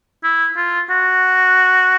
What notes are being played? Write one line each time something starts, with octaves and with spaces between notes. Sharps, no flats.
E4
F4
F#4